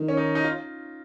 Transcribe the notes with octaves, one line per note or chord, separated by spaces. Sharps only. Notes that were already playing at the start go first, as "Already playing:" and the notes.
Already playing: D#3
C#4
D#4
D#4
F4